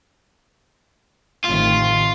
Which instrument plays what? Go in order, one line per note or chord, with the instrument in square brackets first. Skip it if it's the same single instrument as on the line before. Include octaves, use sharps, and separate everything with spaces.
[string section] A1 C3 D#3 [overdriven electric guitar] F4